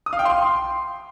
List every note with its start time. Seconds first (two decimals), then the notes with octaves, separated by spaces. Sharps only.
0.06 D#6
0.13 F5
0.19 G5
0.25 C6